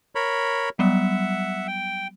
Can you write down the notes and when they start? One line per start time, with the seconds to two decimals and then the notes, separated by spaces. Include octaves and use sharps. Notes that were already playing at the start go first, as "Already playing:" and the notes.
0.15 A#4 C#5 B5
0.79 F#3 G3 B3 E5 F#5
1.67 G5